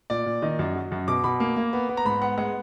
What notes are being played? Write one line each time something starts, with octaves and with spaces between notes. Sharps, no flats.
A#2 D5
A#2
D#3 D#5
F#2
F#3
F#2
B2 D6
B2 B5
A#3
A#3
B3
B3
A#5
G#2 B5
B3 F#5
G#3 F#5